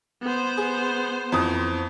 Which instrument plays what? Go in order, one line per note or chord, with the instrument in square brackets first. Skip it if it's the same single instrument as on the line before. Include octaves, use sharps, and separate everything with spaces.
[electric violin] B3 C5
[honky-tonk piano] G#4
F2 E3 D#6